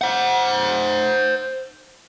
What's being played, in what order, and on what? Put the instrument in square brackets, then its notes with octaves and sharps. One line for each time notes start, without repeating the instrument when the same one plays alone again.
[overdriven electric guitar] C5 F#5